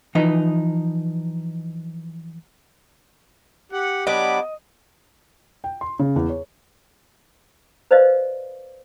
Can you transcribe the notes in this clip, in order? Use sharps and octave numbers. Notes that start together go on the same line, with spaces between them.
E3 F3 D#4 B4 D#5
G4 F#5
F#3 B3 D4 D#5 B5 D6
G5
C6
C#3
E2
C#5
B4 C5 D5 D#5 F5